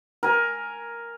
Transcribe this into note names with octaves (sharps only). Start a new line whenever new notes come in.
A#4 G#5